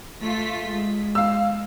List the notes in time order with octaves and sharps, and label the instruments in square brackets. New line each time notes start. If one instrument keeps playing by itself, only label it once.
[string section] A3 F4 B6
G#3
[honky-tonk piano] F5 E6